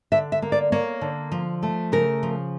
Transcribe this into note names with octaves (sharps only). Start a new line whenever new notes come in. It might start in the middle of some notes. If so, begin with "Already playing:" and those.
D3 E5
E5
A#3
D5
A#3 C#5
D3
F3
A3
C#3 A#4
F3